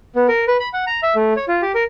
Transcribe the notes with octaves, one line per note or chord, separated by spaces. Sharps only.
B3
A#4
B4
B5
F#5
A#5
E5
A3
C#5
F4
G4
A#4